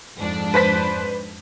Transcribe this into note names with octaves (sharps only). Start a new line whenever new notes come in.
F2 G#2 D4
B4 C5 B6